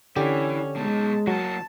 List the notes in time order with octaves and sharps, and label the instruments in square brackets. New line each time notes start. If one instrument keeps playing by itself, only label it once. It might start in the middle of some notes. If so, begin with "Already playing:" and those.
[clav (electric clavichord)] D3 G4 [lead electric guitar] E3 [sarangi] C#4
[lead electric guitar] B2 D#4 [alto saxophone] G#3 [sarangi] A5
[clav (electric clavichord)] F#3 [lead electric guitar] A#3 F#4 [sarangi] A5